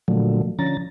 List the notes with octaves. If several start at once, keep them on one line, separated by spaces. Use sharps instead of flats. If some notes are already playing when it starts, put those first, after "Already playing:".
A#2 D3 F3 F#3 A3
D3 F3 C#4 A#5 A6